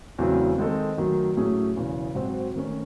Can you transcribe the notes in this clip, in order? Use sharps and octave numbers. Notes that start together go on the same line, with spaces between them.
E2 C#3 F#3 A3 C4
D#3 G#3 C4 D#4 A4
F#2 D#3 F#3 A3
A2 F#3 A3 C#4 G#4
E1 E2 C#3
G#2 F#3 C4 F#4 C5
D#3 A3 C#4